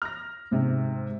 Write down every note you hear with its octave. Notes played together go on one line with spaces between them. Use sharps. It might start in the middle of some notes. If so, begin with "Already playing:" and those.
F6 A#6
G#2 C3